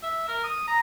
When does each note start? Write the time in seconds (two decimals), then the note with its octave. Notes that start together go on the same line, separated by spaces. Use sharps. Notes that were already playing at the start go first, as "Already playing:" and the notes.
0.03 E5
0.28 A#4
0.44 D#6
0.68 A#5